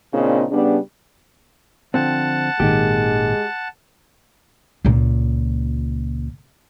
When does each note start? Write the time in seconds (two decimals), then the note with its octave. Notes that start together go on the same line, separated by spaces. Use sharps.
0.13 A#2 C#3 C4 D4 D#4
0.51 C#3 G3 B3 D4
1.94 D3 F3 C4 F#5 A5
2.60 G#1 A#2 D#3 G#3 G4
4.85 C#2 A#2